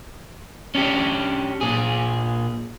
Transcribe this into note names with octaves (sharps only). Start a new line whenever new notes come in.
C#4 D4 G4
A#2 G#4